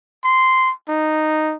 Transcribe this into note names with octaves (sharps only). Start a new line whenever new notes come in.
C6
D#4